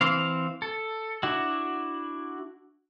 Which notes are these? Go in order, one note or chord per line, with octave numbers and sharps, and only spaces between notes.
E3 C4 F5
A4
D4 E4 F#4